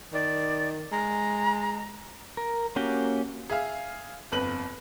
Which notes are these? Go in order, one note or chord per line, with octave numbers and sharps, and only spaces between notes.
D#3 D5
G#3 A#5
A#4
A#3 C#4 F#4 G4 G5
G#4 E5 F5
G1 F2 B4 F#7